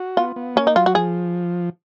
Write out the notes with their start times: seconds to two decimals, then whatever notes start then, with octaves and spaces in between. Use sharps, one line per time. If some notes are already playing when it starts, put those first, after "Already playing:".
Already playing: F#4
0.17 B3 F4
0.36 B3
0.56 A#3 C#4
0.67 D#4
0.76 F#3 F4
0.86 F#4
0.95 F3 G#4